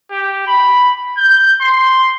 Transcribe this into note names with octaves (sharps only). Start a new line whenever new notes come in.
G4
B5
G6
C6